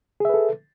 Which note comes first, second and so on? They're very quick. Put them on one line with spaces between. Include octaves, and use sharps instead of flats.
G#4 E5 B4 A4